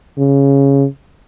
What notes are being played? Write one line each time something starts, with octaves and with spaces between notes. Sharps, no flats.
C#3